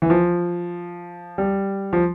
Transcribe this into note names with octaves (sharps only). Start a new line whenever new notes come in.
E3
F3
G3
F3